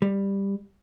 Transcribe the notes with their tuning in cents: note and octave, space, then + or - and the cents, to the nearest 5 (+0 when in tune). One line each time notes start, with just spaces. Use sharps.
G3 +10